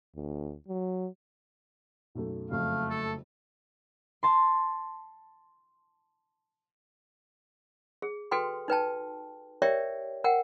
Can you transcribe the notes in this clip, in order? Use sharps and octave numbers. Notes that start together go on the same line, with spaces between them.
D2
F#3
B1 F#2 A3
F#1 F2 A3 F5
A4
A5 C6
G#4
F#4 A4 B4 G5 C6
D#4 B4 G5 A5
G4 A#4 C#5 D5 E5 G5
A#4 F#5 G5